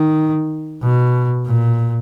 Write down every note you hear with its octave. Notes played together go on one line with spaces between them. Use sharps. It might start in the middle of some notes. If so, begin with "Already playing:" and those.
Already playing: D#3
B2
A#2